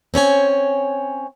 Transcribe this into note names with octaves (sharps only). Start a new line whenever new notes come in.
C4 C#4 C#5 G#5